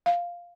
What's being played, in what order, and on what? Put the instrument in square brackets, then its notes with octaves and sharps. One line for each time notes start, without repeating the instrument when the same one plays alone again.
[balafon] F5